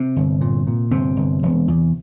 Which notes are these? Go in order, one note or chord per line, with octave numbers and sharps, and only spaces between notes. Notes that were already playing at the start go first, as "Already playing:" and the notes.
Already playing: C3 C4
G1
A#2
A#2
G1 C3 C4
G1
E1
E2